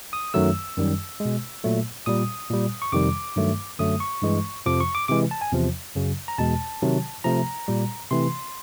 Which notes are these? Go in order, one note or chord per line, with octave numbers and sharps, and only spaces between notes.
D#6
F#2 D#3 F#3 A3 E6
F#2 D#3 G3
G#3
B2
A#2 F#3 A3
A#2 G3 D#6
A#2 G3
C#6
F2 C3 D#3 G3 D6
G2 D#3 F#3 A3
F#2 D3 F#3 A3 D#6
C#6
G2 E3 G#3
F2 C3 F3 D6
C#6
D6
C3 E3 G#3 D6
A5
G#5
E2 C3 F3
F#2 C#3 F#3
A#5
E2 B2 G#3 A5
C3 D#3 F#3
C3 F3 A3 A#5
A#2 G3
C3 E3 A3 C6